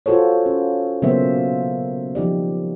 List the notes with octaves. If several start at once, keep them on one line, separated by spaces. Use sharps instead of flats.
F4 F#4 A4 C5 C#5
C#4
C#3 F#3 A#3 B3 C5 E5
F3 D#4 G4 D5